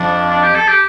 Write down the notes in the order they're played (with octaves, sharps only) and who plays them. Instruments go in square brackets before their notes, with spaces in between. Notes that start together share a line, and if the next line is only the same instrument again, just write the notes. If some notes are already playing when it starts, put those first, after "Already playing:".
Already playing: [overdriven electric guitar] F2 [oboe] D4
[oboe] D4
G4
A4
G4